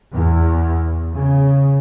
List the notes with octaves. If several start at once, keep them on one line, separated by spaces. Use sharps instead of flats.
E2
C#3